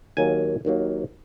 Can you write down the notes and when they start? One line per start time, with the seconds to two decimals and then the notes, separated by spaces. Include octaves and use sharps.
0.17 D#2 D#3 F#3 A#3 G#5
0.65 D#2 D#3 F#3 A#3